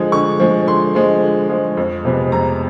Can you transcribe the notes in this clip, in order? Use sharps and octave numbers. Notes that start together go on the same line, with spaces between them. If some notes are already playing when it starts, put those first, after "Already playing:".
Already playing: D3 F3 G#3
D3 C#6
F3 G#3
D3 C6
F3 G#3
D3
F3 G#3
F2
C3 F3 G#3 B3
F2 A#5